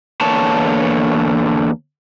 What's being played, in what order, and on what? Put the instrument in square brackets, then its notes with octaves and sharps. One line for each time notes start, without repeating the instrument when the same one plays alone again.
[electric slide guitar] E2 D3 A#3 C#5 A5